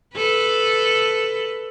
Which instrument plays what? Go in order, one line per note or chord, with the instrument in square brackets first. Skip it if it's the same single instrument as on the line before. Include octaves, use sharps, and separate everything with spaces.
[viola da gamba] A4 B4